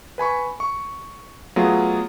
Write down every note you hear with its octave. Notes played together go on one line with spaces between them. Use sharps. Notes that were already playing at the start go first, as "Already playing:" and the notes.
B4 G#5 B5 C#6
C#6
F#3 A3 B3 F4 G#4